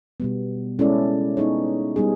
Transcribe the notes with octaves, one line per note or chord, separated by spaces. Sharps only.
B2 G3 B3
G#3 C#4 E4 A4 D5
B3 D#4 G#4 C#5
G3 B3 D#4 G#4